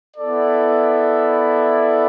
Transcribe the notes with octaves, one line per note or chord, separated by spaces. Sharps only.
B3 E4 A4 D5